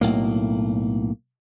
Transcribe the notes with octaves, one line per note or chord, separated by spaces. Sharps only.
B1 A2 A#3